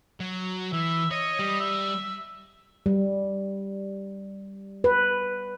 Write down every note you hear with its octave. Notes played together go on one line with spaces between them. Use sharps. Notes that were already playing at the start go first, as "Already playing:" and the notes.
F#3
E3 E5
C#5 D#5
G3
E5
G3
B4